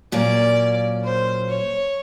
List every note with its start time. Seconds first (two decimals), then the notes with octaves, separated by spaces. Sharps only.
0.12 A#2 F#3 A#3 C#4 D5
1.04 C5
1.49 C#5